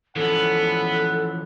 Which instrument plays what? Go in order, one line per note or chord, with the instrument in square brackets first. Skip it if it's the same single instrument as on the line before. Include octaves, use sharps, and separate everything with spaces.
[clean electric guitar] E3 F3 C#4 [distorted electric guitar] B3 [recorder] A4 [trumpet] F#5